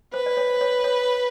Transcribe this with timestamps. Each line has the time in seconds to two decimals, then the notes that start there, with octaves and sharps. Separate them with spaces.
0.13 B4 C5
0.26 D5
0.37 C#5
0.61 C#5
0.84 C#5